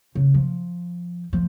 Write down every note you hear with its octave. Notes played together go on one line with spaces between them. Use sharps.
C#3
F3
F3